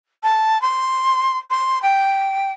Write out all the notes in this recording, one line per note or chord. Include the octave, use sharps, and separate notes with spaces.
A5
C6
C6
G5